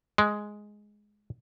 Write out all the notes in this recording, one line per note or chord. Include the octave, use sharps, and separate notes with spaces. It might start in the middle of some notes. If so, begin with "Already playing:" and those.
G#3